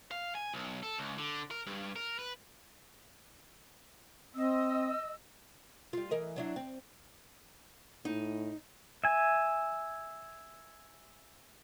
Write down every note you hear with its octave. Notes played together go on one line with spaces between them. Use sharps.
F5
G#5
B1
A4
C#2
D3
A#4
G2
A#4
B4
C4 D#5 E6
G3 F4
E3 A#4 D#5
F#3 D4 E4
C4
A2 D#4
E5 G#5